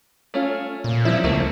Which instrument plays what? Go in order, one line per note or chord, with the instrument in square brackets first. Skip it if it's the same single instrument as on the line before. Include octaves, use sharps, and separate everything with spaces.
[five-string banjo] A3 C#4 F4
[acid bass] A#2
[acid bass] F3 [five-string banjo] G3 C4 E4
[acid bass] C#2 [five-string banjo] A3 A#3 C4